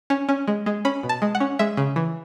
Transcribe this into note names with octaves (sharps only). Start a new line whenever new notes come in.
C#4
C#4
G#3
G#3
C#4 B5
B2
A5
G#3
F#5
C#4
G#3 E5
C#3
E3